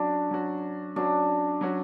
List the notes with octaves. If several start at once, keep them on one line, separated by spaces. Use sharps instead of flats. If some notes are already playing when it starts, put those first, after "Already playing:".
Already playing: F#3 C#4 D4 F#4
F#3 C#4 F#4
F#3 C#4 D4 F#4
F#3 C#4 F#4